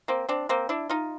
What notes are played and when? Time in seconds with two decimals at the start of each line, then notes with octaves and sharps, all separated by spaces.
0.08 A#3 C4
0.29 C4 D4
0.49 A#3 C4
0.69 D4 E4
0.89 D#4 F4